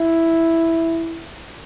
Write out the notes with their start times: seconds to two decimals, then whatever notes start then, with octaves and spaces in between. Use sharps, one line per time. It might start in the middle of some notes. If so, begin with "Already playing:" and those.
Already playing: E4